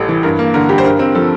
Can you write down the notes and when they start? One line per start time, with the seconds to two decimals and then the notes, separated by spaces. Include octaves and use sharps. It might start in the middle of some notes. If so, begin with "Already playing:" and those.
Already playing: A1 G3 A4
0.09 E3
0.23 G2 A#4
0.39 A#3
0.54 D3 A#4
0.69 G3 G4
0.78 C5
0.84 G2 A#4
0.99 C4
1.15 F3 A4